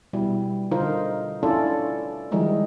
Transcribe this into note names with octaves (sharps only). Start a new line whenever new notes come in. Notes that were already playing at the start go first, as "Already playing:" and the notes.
B2 G3 E4
D3 D#4 F4 A#4 C5
C#4 D4 E4 F4 A4 D5
D#3 F3 G3 G#3 D#4 E4